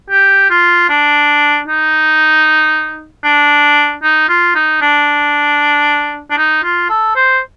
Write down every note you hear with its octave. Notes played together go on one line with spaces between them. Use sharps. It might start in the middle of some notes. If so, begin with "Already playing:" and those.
G4
F4
D4
D#4
D4
D#4
F4
D#4
D4
D4
D#4
F4
A4
C5